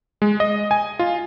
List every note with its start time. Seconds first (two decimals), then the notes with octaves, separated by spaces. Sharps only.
0.22 G#3
0.40 D#5
0.71 G#5
0.99 F4